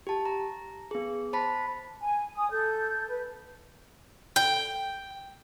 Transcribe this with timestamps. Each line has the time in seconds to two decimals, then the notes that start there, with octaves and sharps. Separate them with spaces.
0.07 G4 A5
0.25 A#5
0.91 B3 G#4
1.33 C5 A5 B5 B6
2.01 G#5
2.36 G#5 D#6
2.51 A4 G6
3.08 B4
4.36 G5